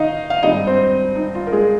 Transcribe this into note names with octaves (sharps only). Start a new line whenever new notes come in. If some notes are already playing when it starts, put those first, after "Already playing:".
Already playing: D#3 D#4 D#5 F5
F5
G#1 G2 G3 D#4 D#5
C4 C5
D#4
F4
A#4
G#3 G#4